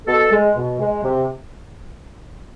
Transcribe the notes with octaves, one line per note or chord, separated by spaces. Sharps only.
B2 A4
G#3
B2
G#3
C3